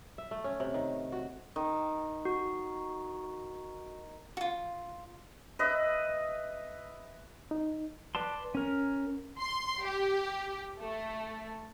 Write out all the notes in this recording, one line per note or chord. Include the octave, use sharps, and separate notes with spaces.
E5
A3
C#4
C3
D#3
F#4
D#3
F#4
F4 F#4
B4 D#5 E5
D#4
B4 D5 A5 C6
C#4 A#4
C6
G4
A3